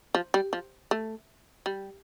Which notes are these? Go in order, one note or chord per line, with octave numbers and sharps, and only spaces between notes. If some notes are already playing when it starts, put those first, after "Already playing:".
F3
G3
F3
A3
G3